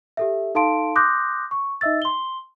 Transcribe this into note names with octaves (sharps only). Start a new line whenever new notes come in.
G4 A4 E5
D#4 A4 F5 A5 C6 D7
C6 D6 D#6 F#6 G6 A#6
C#6
D#4 D#5 E5 E6 A6
C6 G7